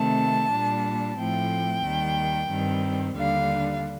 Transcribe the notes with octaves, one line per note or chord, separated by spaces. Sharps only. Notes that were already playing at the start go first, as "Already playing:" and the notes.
Already playing: C3 D#3 A3 C4 A5
A#2 G3 A#3 D4
A2 F3 A3 C4 G5
D#2 D#3 G3
G2 D#3 G3 C4
D#2 D3 G3 D4 F5